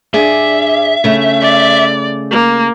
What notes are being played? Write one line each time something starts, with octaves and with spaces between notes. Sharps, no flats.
G2 G#4 D5 E5
C#3 A3
D5
A#3